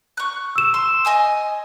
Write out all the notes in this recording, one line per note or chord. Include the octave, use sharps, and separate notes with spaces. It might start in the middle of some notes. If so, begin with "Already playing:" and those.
C#6 F#6
E6 E7
C6
D#5 G#5 D#6